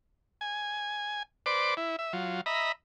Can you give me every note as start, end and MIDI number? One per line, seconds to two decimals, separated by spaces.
0.41 1.23 80
1.46 1.74 71
1.46 1.74 72
1.46 1.74 74
1.46 1.74 86
1.77 1.96 64
1.99 2.13 76
2.13 2.41 54
2.13 2.41 65
2.46 2.72 75
2.46 2.72 76
2.46 2.72 82
2.46 2.72 83